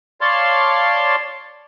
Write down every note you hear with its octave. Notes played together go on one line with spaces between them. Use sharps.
C#5 D5 F5 A5 C6